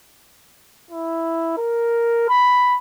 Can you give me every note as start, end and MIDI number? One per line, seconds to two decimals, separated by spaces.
0.91 1.53 64
1.58 2.27 70
2.29 2.78 83